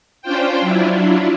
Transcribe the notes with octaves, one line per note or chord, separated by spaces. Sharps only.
C#4 D4 F4 C5 G5
F#3 D4 E4 F4